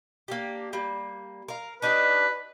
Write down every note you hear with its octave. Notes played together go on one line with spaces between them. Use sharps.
A#3 D4 G4
G3 A#3
A#4 F5
D4 D#4 G4 B4